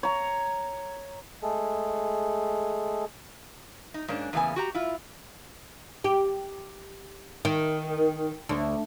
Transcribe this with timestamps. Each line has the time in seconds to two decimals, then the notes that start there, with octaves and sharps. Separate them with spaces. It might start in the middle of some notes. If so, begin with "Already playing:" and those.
0.03 C#5 A#5
1.43 G#3 A3 G#4 A4
3.94 D#4
4.08 G#2 A#3 C#4 D4
4.33 E2 A2 C#3 A#3 B3 G#5
4.56 F#4 G4 A#5
4.75 E4 F4
6.04 G4
7.45 D#3
8.49 D2